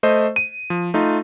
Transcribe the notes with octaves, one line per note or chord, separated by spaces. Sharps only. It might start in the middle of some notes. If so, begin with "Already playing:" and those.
A3 C5 D#5
D#7
F3
A3 D#4 F4